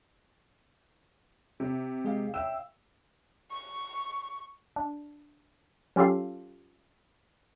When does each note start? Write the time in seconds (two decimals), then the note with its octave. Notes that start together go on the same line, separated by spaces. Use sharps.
1.60 C3
2.05 G#3 G#4 F5
2.34 E5 F5 G5 E6
3.51 C#6
4.76 D4
5.96 F#3 C#4 F4 G4 A4 F5